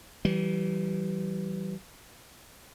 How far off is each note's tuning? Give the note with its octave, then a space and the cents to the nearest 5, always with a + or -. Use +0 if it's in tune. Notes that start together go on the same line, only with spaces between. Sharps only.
E3 +0 G3 -35